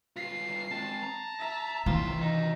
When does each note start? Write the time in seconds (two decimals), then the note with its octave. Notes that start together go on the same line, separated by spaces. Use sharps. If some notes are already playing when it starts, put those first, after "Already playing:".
0.16 G2 F4 C7
0.71 G#3 C4 A5
1.03 A#5
1.39 E5
1.86 C3 D#3 E3 F4
2.21 D#4